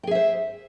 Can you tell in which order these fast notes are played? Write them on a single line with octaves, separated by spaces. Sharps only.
G5 G#4 E5 C5